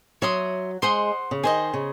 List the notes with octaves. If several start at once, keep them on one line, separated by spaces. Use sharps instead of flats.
F#3 C#5 E5 C6 D#6
G#3 C5 F#5 C6 D#6
C#3
D#3 G#4 C5 D#5
C#3